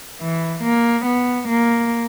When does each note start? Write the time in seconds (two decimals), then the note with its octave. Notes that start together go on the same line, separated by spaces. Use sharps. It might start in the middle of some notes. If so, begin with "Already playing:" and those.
0.21 E3
0.63 A#3
1.06 B3
1.49 A#3